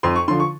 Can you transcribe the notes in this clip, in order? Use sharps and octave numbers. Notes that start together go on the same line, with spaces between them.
F2 C6
C#6
D3 F3 C6
C#6